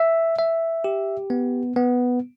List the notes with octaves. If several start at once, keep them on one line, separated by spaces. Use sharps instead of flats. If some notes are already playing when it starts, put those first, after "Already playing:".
Already playing: E5
E5
G4
B3
B3